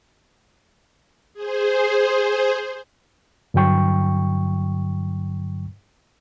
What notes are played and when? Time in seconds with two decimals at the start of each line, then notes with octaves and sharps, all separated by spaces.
1.34 G#4 C5
3.54 G2 D3 F#3 G5 C#6